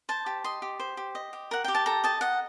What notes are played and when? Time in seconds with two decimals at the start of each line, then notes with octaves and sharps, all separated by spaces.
0.09 C5 A5
0.26 G4
0.44 D#5 C6
0.62 G4
0.80 C5
0.97 G4
1.15 D#5
1.33 G4
1.51 A#4 F#5
1.64 G4 G5
1.75 A5
1.86 A4 A#5
2.04 D#5 A5
2.21 D#5 F#5